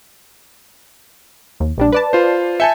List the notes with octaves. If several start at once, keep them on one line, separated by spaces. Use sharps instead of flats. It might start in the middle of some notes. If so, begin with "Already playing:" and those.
D#2
A#1 G3 D4
B4 D5 A5
F4 C5
E5 G#5 A5 G6 C#7